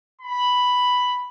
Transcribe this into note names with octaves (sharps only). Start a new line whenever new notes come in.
B5